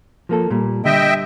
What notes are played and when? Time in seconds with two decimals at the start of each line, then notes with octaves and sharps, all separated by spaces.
0.29 F3 A#3 A4
0.51 A#2 G3
0.85 D3 G3 D#5 E5 G5